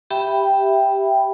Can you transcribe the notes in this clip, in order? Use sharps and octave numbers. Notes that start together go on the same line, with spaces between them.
G4 E5 G5 B5